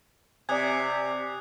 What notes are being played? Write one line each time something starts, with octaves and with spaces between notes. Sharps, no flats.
C3 D5 G#5 D#6 F#6 G#6